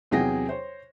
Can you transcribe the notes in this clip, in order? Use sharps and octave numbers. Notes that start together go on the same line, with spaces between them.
E2 C3 F#3 G#4 G5 A#6
C5 C#5